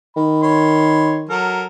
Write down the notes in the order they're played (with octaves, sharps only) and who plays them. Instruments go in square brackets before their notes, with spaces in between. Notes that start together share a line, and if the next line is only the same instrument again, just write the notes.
[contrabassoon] D#3 [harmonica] B5
[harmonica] C#5 B5 C6
F#3 A4 A#4